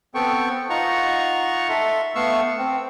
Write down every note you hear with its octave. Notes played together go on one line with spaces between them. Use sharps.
B3 C4 A4 G5 C#6
D#4 F4 F#5 A#5 C#6
A4 E5 C6
A3 B3 F5 C#6 E6
C4